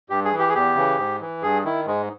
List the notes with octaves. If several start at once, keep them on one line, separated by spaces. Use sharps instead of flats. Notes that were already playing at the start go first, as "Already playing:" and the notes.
G2 G4
G#4
E3
G4
G#4
E2 G4
C#3 E3
G#2
E3
G2 G#4
D#3 E4
G#2 G#3